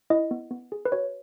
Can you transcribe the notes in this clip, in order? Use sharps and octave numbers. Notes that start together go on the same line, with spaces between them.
E4 D#5
B3
B3
G#4
B4
F#4 C#5